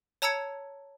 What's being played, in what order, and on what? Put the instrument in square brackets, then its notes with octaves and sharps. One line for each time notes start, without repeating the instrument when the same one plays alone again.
[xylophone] C#5 A5 A#5 E6 G#6 C#7